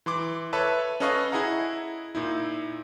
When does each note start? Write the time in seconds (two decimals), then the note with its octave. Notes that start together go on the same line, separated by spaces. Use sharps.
0.06 E3 C6 D6
0.53 A4 B4 C#5 E5 A5
1.00 C#4 A4 B4 D#5 F5 C#6
1.32 E4 G#4 D#5 F#5 A#5
2.15 A#2 D#4 E4